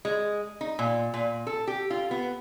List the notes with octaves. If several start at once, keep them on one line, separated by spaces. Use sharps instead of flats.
G#3
D#4
A#2
A#2
A4
G4
F4
B3